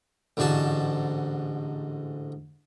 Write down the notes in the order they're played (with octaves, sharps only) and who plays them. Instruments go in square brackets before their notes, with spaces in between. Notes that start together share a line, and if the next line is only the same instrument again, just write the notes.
[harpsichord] A1 G#2 D3 F#4 A5